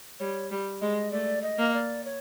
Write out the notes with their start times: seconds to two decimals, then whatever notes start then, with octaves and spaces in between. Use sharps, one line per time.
0.20 G3 C#5
0.51 G3
0.81 G#3 D#5
1.12 A3 D5
1.42 D#5
1.58 A#3
1.74 D5
2.05 C#5